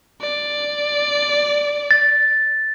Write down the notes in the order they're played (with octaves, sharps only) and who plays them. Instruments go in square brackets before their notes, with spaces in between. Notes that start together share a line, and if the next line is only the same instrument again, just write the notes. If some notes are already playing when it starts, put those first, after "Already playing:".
[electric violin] D5
[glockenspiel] A6